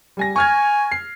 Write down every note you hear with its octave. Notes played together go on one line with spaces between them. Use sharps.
G3 G#5 A#6
G#5 C#6 F6 G#6
C7